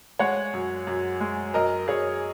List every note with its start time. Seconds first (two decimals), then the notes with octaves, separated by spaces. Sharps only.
0.19 G#3 C#5 F#5
0.53 F#2
0.87 F#2
1.20 G#3
1.54 F#2 A#4 D#5
1.88 F#2 G#4 C#5